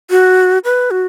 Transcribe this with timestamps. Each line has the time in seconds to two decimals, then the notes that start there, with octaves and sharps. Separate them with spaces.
0.11 F#4
0.65 B4
0.91 F#4